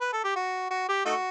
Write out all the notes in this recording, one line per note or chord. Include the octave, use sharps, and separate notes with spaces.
B4
A4
G4
F#4
F#4
G4
A3 D#4 F#4